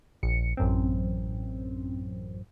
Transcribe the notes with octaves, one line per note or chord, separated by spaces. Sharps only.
A#1 C#7
A1 F#2 C4